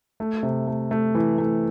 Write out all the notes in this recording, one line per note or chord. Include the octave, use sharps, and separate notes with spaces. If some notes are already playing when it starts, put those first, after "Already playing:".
A3
C3
A3
A3
E3
A3